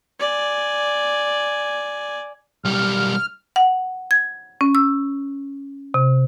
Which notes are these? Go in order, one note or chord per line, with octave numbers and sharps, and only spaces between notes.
D5 G#5
B1 G3 F6
F#5
G#6
C#4
E6
C3